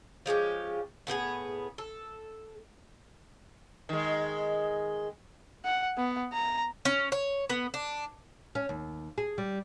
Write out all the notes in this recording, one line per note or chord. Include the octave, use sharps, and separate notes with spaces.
F3 G#3 C#4 G4
A2 B3 G4 G#4
A4
D#3 G#3
F#5
B3
A#5
C#4
C#5
B3
D4
C#4
D#2
G#4
G3